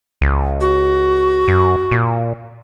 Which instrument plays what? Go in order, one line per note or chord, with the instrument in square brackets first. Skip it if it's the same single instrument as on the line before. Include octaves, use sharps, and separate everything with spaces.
[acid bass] C#2
[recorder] F#4
[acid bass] F#2
A#2